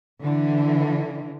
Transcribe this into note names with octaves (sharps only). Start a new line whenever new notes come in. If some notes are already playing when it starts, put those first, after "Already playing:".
D3 E3